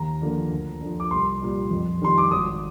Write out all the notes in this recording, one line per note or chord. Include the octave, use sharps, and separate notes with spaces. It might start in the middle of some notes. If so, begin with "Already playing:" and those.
Already playing: D#2 A#5
D3 F3 A#3
D2
D3 F3
D6
C2 C6
A#2 G3
F2
D#3 G3 C6
D6
G#1 D#6